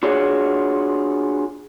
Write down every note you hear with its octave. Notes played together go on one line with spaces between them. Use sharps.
D4 F4 F#4 G#4 C#5